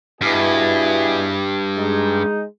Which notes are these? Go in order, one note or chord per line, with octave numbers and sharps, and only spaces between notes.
G2 B2 E4 G#4
G#3 D#4